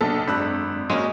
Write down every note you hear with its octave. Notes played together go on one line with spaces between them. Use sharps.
B1 C3 A#3 D4 A4
G#1 F#2 G#3 D4 B5 E6 F#6
G#3 A#3 C#4 F#4